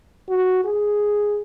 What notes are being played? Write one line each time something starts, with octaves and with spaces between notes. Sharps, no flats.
F#4
G#4